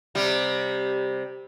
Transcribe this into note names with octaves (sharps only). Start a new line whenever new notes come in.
C3 G3